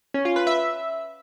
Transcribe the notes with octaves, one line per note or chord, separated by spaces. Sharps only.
C#4
F4
B4
E5